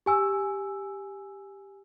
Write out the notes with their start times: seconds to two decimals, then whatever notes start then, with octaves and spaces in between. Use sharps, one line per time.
0.06 G4 G#5 E6